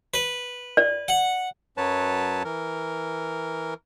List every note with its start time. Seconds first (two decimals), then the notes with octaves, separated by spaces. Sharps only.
0.14 B4
0.77 D5
1.08 F#5
1.77 F#2 F#3 B4 C#5 A5
2.44 E3 A#4